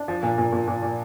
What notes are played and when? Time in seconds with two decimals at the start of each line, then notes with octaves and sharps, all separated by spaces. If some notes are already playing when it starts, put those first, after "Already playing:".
Already playing: D4
0.08 F3
0.23 A#2
0.38 A#2
0.52 A#2
0.68 A#2
0.83 A#2